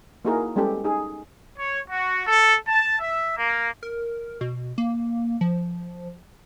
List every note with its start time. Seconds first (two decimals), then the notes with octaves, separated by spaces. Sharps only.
0.25 A#3 D#4 E4 F#4 G#4 A#4
0.56 G3 G#3 B3 C#4 G4 A4
0.84 D#4 G#4
1.58 C#5
1.89 F#4
2.26 A4
2.66 A5
2.99 E5
3.37 A#3
3.83 A#4
4.41 B2
4.78 A#3
5.41 F3